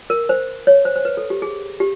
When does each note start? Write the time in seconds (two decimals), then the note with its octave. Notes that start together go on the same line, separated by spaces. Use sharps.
0.10 A#4
0.29 C5
0.67 C#5
0.85 C5
0.96 C5
1.05 B4
1.17 A4
1.30 G4
1.42 G#4
1.80 G4